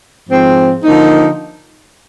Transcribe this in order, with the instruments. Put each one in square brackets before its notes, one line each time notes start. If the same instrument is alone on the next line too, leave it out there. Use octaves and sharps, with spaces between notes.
[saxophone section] G#2 F3 C4
D3 F3 A#3 D#4